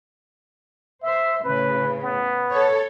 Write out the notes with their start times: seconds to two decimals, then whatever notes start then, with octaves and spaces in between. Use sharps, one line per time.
1.03 C5 E5
1.44 A2 C#3 B4
2.03 B3
2.50 A4 C#5